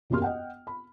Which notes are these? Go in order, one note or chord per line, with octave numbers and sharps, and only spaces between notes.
E1 F#2 A#3 G4 C6 F6
D#5 F#5 G5
B5